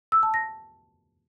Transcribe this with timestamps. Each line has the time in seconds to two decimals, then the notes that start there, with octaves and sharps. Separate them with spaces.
0.12 E6
0.23 A5
0.34 A#6